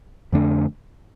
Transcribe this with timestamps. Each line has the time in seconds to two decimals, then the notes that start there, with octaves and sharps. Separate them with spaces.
0.32 F2 D3 A3 D4